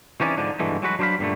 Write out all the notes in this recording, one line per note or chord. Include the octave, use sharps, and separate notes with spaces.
E3 C4 C#4 D#4 G#4 D5
G#2 D3 F3 D4 D#4
G2 B2 D3 E3 G#3 A3
F#3 G#3 F#4 B4
F#3 D4 C5 D5 F5 B5
G2 A#2 D3 A3